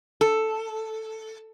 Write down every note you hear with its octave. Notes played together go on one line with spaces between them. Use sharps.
A4